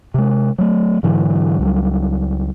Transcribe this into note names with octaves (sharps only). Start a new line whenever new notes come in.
C3 G#3
F#3 A3
G#2 D3 E3 F#3
C#2 F#3 G3